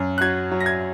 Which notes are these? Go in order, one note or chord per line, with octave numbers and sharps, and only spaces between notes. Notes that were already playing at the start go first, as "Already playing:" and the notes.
Already playing: F#2
F#6
F#3 G#6
F#3
A#6
G#6